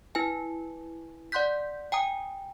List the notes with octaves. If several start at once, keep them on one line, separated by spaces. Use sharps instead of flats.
E4 B4 G#5
D5 F#5 C6 F#6 G6 B6
G5 G#5 A#5 D#6